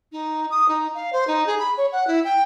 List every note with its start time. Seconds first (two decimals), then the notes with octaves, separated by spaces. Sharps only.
0.12 D#4
0.50 D#6
0.68 D#4
0.94 F5
1.12 C5
1.27 D#4
1.46 G#4
1.59 B5
1.77 C#5
1.92 F#5
2.07 E4
2.24 G5